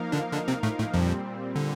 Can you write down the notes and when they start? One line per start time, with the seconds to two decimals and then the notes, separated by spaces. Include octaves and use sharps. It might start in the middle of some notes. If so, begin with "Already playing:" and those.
Already playing: F3 A#3 D#4 A#4 F5
0.12 D3 D4
0.33 D3 D4
0.48 C3 C4
0.63 A2 A3
0.79 A2 A3
0.94 F2 A#2 F3 G3 C4
1.56 D3